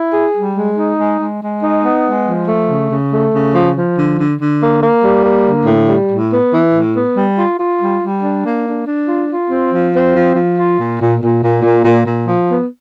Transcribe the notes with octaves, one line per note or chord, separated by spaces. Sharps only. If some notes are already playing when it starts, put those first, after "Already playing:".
Already playing: E4
G#4
G3
G#3
D#4
G#3
G#3
G#3
D#4
B3
G#3
F3
A3
C#3
C#3
A3
C#3
F3
F3
D3
D3
D3
A#3
A#3
G3
A#3
D3
A2
G3
A2
B3
E3
A2
B3
G3
F4
F4
G3
G3
D4
A#3
D4
D4
F4
F4
C4
F3
C4
F3
F3
F4
A#2
A#2
A#2
A#2
A#2
A#2
A#2
F3
B3